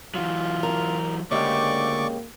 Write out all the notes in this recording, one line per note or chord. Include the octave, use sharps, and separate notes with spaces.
E3 F#3 F4
A#4
D2 C#3 G#3 A#3 G4 D5 C#6 D6